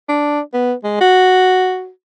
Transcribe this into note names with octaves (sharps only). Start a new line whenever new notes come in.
D4
B3
G#3
F#4